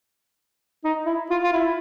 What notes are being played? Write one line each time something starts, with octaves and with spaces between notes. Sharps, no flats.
D#4
E4
F4
F4
E4